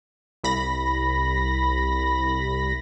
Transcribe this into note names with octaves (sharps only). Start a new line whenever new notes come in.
C2 B5 A#6